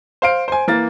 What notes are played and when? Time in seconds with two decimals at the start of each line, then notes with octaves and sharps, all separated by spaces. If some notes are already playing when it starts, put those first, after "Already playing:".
0.22 C5 F5 D7
0.48 C5 G#5
0.68 E3 A#3 A#4 A6